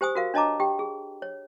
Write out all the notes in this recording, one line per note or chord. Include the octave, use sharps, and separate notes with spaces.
G4 C5 G#5 D#6
F#4 A#4 F5
D4 C#5 D#5 A5 A#5 D6
G4 G5
G#4
C#5